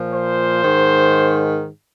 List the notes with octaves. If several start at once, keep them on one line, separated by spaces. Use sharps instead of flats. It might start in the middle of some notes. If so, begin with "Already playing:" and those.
Already playing: A#2 F3
C5
G#2 D#3